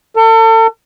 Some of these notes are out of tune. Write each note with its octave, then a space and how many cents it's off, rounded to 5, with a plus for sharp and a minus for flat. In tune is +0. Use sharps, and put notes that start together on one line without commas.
A4 +35